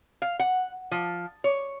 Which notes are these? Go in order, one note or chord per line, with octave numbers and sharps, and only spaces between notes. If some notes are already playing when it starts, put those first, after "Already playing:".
F5
F#5
F3
C#5